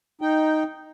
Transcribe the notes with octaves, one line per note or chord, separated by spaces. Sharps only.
D#4 G5